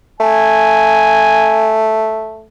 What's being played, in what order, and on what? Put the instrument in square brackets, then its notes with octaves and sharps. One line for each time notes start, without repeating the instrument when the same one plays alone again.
[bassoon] A3 [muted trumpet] G#5